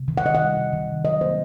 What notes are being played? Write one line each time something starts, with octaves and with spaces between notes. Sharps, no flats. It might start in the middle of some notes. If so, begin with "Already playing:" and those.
Already playing: C3
D#3
F#5
D#3 D#5
F#5
G3
C3
D#3
C3
F#3 D#5
A#3 C5